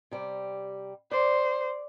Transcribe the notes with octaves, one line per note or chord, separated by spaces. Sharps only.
C3 G3
C5 D5